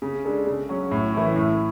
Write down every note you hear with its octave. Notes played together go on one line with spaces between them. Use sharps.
C#3
G#3 D4 A4
C#3
F#3 C#4
A2
E3 A3 C#4 E4
A2